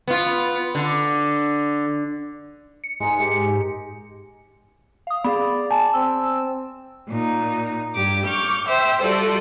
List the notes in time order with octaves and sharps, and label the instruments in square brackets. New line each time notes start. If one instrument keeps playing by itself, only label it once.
[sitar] B3 F4
D3
[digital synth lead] C#7
[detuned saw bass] G#2 [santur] G#3 D#4 G#4
[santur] G#3 A#3 G4
[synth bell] F5 D#6
[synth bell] B3 G#4 F5 [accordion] D5 [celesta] B5
[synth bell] G#5 [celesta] A5
[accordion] C4 E6
[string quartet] A#2 D#4
G2 G4 D6
C#6 D6 F6 G6
C5 E5 G5
G3 F4 F#4 A4 D5